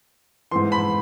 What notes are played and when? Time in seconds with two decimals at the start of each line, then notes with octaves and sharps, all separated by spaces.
0.51 G#2 E3 C6
0.72 B5